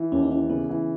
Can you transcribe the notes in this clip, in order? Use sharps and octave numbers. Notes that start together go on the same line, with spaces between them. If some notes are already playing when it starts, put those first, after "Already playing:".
Already playing: E3
D#2 C#4
D#4
E3 C#4
C#3 B3
E3